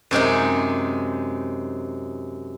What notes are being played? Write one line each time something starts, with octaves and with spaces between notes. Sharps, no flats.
F#2 C3 G#3 D#4